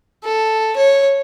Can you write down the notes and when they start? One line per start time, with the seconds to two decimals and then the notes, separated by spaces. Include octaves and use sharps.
0.25 A4
0.77 C#5